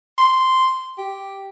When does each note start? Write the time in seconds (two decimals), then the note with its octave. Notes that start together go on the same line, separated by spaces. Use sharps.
0.18 C6
0.98 G4